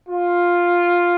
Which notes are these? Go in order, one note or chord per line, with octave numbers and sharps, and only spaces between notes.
F4